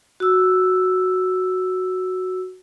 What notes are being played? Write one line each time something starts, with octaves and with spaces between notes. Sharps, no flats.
F#4 E6